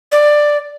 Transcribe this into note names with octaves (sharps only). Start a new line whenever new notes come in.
D5